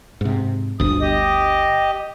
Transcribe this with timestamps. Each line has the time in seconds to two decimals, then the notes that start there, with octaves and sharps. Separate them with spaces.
0.21 G#2 C3
0.80 G1 D2 D#6
1.01 G4 D#5